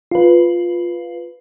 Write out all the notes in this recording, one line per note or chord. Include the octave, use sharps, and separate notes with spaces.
F4 B4